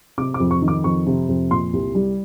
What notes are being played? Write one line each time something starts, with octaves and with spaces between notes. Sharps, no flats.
C3 D6
D6
F2
C#6
D#3
D6
F2 C#6
C3
F2
A#2 C6
C2
G3